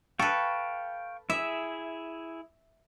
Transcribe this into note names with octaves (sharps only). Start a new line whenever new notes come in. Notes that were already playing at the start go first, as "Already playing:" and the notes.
A4 B4 F5 G5 C#6
E4 G#4 E5